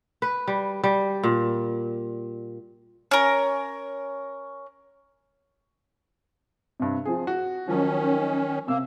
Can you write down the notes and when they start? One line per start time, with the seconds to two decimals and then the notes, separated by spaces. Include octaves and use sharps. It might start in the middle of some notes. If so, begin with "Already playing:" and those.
0.22 B4
0.48 G3
0.84 G3
1.23 A#2
3.11 C#4 A#4
6.80 G2 C3
7.05 F3 C4 G#4
7.27 F#4
7.68 D#3 F3 F#3 C#4
8.68 C3 A#3 E6